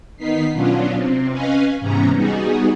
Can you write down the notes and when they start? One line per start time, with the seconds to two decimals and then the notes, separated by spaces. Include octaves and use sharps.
0.17 D#3 B3 D#4 B6 C7
0.53 B2 F#3 B3 C#4 D4 F4
0.94 C3 C4
1.30 C#4 B4 D#5 F5 G#5
1.80 G#2 C3 E3 B3 C#4 A#5
2.12 G3 B3 D#4 F#4 G#4